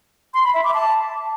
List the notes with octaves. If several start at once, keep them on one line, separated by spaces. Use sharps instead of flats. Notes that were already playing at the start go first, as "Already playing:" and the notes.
C6
B5
E5
D6
A5